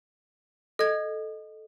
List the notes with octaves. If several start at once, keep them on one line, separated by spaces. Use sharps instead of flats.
A4 D#5 G#6